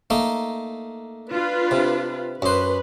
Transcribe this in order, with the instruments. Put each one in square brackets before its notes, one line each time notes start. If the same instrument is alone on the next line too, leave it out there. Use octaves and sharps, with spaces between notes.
[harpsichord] A3 A#3 D#4
[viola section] D4 F4 B4
[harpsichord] C3
[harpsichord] F#2 C5 [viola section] B4